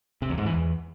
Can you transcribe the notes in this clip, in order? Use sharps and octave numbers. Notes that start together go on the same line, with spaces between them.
C3
E2
G#2
E3
E2